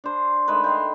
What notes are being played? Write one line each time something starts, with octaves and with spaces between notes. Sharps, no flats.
D4 C5
D#3 G#3 A3 B4
G5 A#5 C6